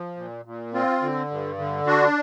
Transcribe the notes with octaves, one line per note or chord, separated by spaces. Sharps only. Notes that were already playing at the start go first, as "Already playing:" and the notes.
Already playing: F3
A#2
A#2
C4 F4
D3
G2
D3
D4 F#4